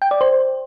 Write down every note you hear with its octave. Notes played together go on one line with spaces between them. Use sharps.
G5
D5
C5